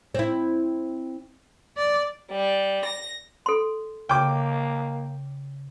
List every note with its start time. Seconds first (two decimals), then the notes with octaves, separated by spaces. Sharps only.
0.15 C4 E4
1.77 D5
2.32 G3
2.85 A#6
3.46 A4 C6
4.09 C#3 A#3 G5 D6